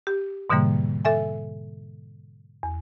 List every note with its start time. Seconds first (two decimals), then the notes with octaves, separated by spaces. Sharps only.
0.07 G4
0.50 G#2 B2 D3 E3 G3 A#3
1.05 A4 E5 G#5
2.63 E2